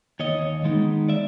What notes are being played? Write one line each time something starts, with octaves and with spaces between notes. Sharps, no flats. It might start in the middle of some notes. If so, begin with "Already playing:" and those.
D#2 C#5 D#5
D#3 G#3 B3 D#4
D5 E5